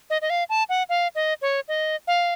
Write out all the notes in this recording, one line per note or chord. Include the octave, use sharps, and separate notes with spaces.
D#5
D#5
F5
A5
F#5
F5
D#5
C#5
D#5
F5